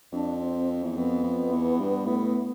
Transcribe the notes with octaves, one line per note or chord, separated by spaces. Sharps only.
F2 D4
C4
E2
F2 B3
F2
E2
G2
A2